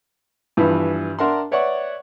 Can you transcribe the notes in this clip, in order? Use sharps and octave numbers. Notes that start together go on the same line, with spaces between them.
G2 E3 F3 B3
D4 A#4 E5 F#5 A#5 C6
B4 C#5 D5 E5 F#5 C#6